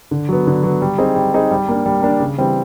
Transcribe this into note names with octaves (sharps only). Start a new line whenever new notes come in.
D3
F#3 B3
D3
F#3 B3
G3
C4 D#4 G#4
G3
C4 D#4 G#4
G3
A#3 D4
G3
A#3 D4
C#3
E3 G3 C4